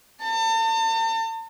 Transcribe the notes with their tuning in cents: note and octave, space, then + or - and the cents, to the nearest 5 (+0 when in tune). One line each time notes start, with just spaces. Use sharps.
A5 +40